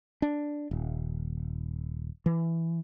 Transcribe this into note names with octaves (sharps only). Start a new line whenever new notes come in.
D4
D#1
E3